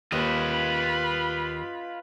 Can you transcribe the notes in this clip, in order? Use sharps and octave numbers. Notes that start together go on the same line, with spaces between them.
D#2 F4 B4 D#5 B5